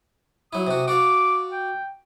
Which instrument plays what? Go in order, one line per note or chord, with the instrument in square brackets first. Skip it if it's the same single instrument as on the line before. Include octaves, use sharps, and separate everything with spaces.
[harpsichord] F#3 E4 [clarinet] D#6
[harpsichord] C3 F#4
[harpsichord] F#4 D5 F5 [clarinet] D6
[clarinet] G5